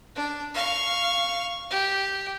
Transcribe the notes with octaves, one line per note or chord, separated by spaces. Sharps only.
D4
F5 C#6
G4